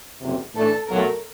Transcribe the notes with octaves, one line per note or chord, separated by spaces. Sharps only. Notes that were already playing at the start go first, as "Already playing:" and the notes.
F#1 E2 C3
A2 E3 A3 D4 A4
B1 A#2 F#3 A3 A#4